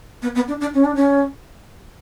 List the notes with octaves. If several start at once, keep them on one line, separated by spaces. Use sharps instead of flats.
B3
B3
D4
D4
C#4
D4
C#4